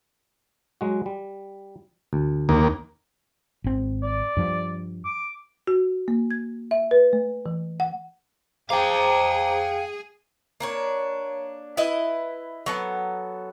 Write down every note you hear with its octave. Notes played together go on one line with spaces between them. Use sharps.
F#3 G#3 F#4
G3
D2
D#2 A#3
G#1 C4
D5
G2 F3 G3
D6
F#4
A#3
G#6
E5
B4
A3
E3
F#5
G#4 C5 F5 G5 A#5 D6
A#3 D4 C#5
E4 B4 D#5
F#3 B3 A4